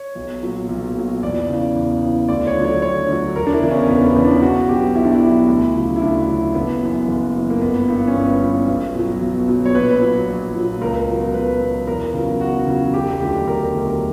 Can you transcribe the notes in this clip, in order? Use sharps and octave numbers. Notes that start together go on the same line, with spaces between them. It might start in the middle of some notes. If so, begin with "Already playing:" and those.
Already playing: C#5
B1
A#2 F#3
B1
A#2 F#3
E2 D5
C#3 E3
E2
C#3 E3
D2 D5
C#5
D3 F#3
C#5
D2 C#5
D3 F#3
E1 A#4
D4
E4
E2 C#3 E3
C#4
E1 B3
B3
E2 C#3 E3
D4
B1 F#4
B2 F#3 G4
B1 E4
D4
E4
B2 F#3
D2
C#3 F#3
E4
D2 D4
C#3 F#3
F#1 B3
F#2 E3
F#1
F#2 E3
A#3
G1 B3
G2 E3
C#4
G1 B3
G2 E3
B1
B2 F#3
B1
B2 F#3
C#5
A#1 B4
A#2 F#3
A#1
A#2 F#3
C#2 A#4
B2 F#3
C#2 B4
B2 F#3
E2 A#4
C#3 F#3
E2 F#4
C#3 F#3
E1 G4
D2 D3 F#3 G4
E1 A#4
D2 D3 F#3